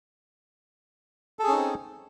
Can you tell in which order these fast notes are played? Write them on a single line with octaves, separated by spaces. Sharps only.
A4 G#4 C#4 D#4 C4